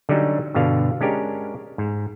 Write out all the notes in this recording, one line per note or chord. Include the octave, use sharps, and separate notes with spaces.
D3 F#3 G3 C#4 D#4
G2 B2 D3 F5
G#3 C#4 D4 G4 A#4
G#2